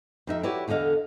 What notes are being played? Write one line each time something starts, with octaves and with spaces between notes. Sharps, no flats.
F2 D#4 E5
E4 F#4 G4 B4 C#5 D5
E2 D3 A4 D#5 F5